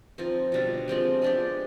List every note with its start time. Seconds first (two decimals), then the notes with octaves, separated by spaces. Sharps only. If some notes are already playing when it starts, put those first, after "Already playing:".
0.18 F3 C4 D#4
0.52 B2 G3 D4
0.88 F3 G#3 C4 G4
1.22 G#3 B3 D4 G4